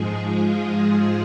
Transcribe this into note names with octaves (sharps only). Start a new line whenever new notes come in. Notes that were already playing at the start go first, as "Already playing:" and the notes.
Already playing: G#2 F3 G#3 G#4
F4
G#4